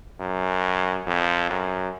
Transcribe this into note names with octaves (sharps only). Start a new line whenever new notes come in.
F#2
F2
F#2